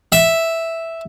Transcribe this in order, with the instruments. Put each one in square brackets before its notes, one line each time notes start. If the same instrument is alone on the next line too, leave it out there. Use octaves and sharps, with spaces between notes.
[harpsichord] E5